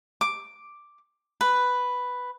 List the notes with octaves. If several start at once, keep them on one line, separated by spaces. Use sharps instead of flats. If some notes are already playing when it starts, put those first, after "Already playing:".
D6
B4